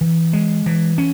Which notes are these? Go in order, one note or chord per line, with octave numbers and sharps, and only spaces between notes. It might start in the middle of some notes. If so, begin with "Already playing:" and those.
E3
G#3
E3
C#4